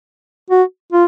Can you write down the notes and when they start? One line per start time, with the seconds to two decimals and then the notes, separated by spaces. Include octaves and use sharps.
0.50 F#4
0.92 F4